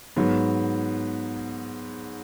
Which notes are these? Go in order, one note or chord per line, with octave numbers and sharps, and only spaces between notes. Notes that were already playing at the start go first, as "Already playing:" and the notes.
G#2 F#3 B3